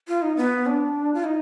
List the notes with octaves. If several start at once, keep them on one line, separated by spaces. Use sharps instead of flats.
F4
D#4
B3
D4
F4
D#4